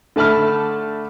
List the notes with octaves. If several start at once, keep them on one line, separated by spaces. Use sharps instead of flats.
D3 A3 A5 B5 F6